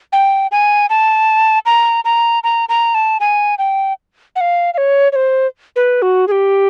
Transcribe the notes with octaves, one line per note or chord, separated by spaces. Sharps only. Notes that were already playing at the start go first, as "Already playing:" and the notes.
G5
G#5
A5
A#5
A#5
A#5
A#5
A5
G#5
G5
F#5
F5
F5
C#5
C#5
C5
B4
F#4
G#4
G4